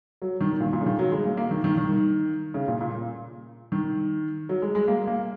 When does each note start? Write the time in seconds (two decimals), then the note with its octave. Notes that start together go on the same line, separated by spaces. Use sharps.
0.22 F#3
0.41 D#3
0.60 A#2
0.73 A#2
0.81 C#3
0.86 D#3
0.99 F#3
1.12 G#3
1.25 A#3
1.37 A#3
1.51 D#3
1.64 D#3
1.77 D#3
2.54 C#3
2.68 A#2
2.81 A#2
3.72 D#3
4.49 F#3
4.62 G#3
4.75 G#3
4.88 A#3
5.07 A#3